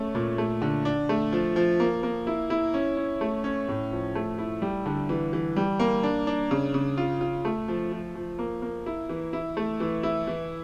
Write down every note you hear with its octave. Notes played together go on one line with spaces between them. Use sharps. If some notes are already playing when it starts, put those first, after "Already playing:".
Already playing: A3 C#4
A#2
A3
D3
D4
A3
F3
F3
A#3
A#3
E4
E4
C#4
C#4
A3
C#4
A2
F3
A3
E4
G3
D3
E3
E3
G3
A#3
D4
D4
C#3
C#3
F4
F4
A3
F3
F3
F3
A#3
A#3
E4
E3
E4
A3
E3
E4
E3